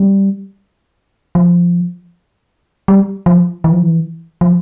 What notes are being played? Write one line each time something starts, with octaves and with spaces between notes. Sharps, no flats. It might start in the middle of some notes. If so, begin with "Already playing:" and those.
Already playing: G3
F3
G3
F3
E3
F3
E3
F3